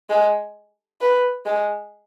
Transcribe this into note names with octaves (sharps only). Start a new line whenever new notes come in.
G#3
B4
G#3